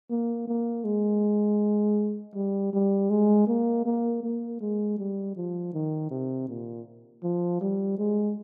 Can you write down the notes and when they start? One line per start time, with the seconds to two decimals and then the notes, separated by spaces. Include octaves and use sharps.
0.10 A#3
0.48 A#3
0.85 G#3
2.35 G3
2.73 G3
3.10 G#3
3.47 A#3
3.86 A#3
4.23 A#3
4.61 G#3
4.98 G3
5.36 F3
5.74 D#3
6.11 C3
6.48 A#2
7.23 F3
7.61 G3
7.98 G#3